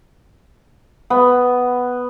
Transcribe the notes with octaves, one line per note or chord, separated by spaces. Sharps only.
B3